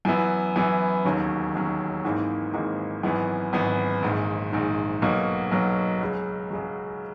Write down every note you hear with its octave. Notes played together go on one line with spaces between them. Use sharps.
F#2 E3 B3 E4
F#2 E3 B3 E4
E1 D#2 D#3 F#3 C#4
E1 D#2 D#3 F#3 C#4
G#1 G#2 E3 A#3 D#4
G#1 G#2 E3 A#3 D#4
G#1 F#2 E3 B3
G#1 F#2 E3 B3
A#1 G#2 D#3
A#1 G#2 D#3
B1 B2 F#3 A#3
B1 B2 F#3 A#3
C#2 C#3 F#3
C#2 C#3 F#3